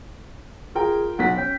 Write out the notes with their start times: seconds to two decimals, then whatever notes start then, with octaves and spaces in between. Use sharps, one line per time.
0.75 F4 G#4 A#4 G5
1.19 B1 F#5 B6
1.37 C#4 G5